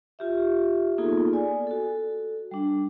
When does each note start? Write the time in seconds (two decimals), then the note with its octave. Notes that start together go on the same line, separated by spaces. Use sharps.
0.19 F4 G4 E5
0.98 A#3 B3 D#4 F4 G#4 A4
1.33 D5 G#5
1.67 F#4 A4
2.51 G3 D4